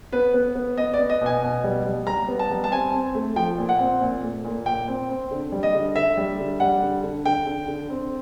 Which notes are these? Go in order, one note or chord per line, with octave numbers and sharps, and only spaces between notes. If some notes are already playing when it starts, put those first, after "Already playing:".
B3 B4
B3
B3
B3 D#5
D5
B3
D#5
B2 G#5
B2
G3
G3
G3 A#5
B3
A5
G3
A5
C4 G#5
C4
A3
F3 G5
A#2
F#5
C4
A#2
A3
A#2
A#2 G5
C4
C4
D3
G3
D#5
D3
D3 E5
G3
D3
G3 F#5
D3
D3
D3 G5
D3
D3
C4